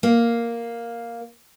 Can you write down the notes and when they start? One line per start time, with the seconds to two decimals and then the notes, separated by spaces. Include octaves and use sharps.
0.03 A#3